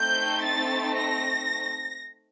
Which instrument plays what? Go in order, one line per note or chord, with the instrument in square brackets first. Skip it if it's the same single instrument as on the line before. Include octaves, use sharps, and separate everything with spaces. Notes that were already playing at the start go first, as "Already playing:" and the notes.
Already playing: [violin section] A3 C4 D#4 G6
A6
A#6